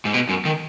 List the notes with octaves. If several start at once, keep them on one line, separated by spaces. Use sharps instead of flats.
G#2
B2
F#2
D#3